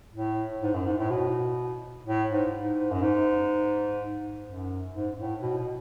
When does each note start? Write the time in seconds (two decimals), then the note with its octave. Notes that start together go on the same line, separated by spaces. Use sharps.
0.14 A2
0.62 G#2
0.74 F#2
0.86 G#2
0.98 A2
1.10 B2
2.06 A2
2.30 G#2
2.54 G#2
2.91 F#2
3.02 G#2
4.46 F#2
4.94 G#2
5.18 A2
5.42 B2
5.58 B2